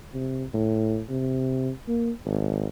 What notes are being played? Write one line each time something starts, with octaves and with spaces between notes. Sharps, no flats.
C3
A2
C3
A#3
G#1